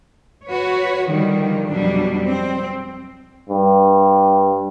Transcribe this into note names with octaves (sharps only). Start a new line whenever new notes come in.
F#4 B4 C#5
D3 D#3 F3 G3
F2 B2 F#3 G3 D4
C4
G2